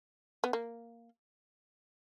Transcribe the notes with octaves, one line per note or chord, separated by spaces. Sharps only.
B3
A#3